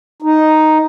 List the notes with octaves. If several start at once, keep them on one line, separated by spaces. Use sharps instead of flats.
D#4